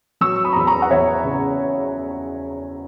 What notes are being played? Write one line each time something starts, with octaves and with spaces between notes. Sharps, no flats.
F#3 C#6 E6
B5 D#6
A#5
E2 B5
A#5 C#6
F#5
E2 C#5 E5
C#3